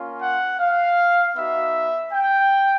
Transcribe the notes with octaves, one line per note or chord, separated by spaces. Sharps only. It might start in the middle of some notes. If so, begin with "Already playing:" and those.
Already playing: A#3 C#4 F4
F#5
F5
B3 D#4 F#4 E5
G5